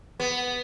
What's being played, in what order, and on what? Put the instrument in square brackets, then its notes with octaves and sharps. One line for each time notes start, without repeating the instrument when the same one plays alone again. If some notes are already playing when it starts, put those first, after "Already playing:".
[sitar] B3